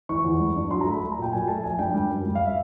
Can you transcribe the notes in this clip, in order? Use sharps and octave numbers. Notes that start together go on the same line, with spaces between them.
E3 C#6
E2
G3
G2
F#3 C6
A#5
A3 B5
A3
A#5
A#2
G5
F#3 G#5
A3 A5
F3 G#5
G2 G5
G3
F#2
G3
F5
E5